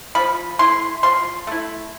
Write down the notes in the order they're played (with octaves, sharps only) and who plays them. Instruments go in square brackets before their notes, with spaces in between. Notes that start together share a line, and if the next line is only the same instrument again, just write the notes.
[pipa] F3 B5
A3 E4 C6
F3 C6
A3 E4